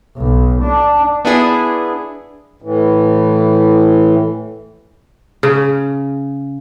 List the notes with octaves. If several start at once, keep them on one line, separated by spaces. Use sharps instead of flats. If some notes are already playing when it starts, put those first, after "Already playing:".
B1
D4
B3 D4 E4 G#4
A2 E3
C#3